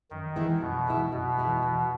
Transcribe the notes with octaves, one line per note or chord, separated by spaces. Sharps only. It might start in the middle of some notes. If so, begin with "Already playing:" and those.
F#2 D#3
E3 G#3 B3 E4
F#2 B2
E3 G#3 B3 E4
F#2 B2
E3 G#3 B3 E4
E2